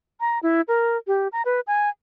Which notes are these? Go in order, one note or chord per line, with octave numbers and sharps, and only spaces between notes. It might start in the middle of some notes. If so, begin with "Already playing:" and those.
A#5
E4
A#4
G4
A#5
B4
G#5